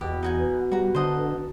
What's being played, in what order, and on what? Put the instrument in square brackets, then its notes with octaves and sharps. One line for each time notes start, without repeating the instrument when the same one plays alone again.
[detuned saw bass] E2 [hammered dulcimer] B2 [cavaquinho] G4
[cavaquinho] D#4 F#4 G#5
[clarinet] B4
[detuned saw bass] G3 [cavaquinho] F#4 A#5
[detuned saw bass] D3 [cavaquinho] C5 D#5 F#5 [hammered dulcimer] A5 A#5